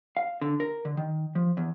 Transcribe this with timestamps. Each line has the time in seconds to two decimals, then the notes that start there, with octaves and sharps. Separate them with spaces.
0.17 F5
0.41 D3
0.60 A#4
0.85 D3
0.97 D#3
1.35 F3
1.57 E2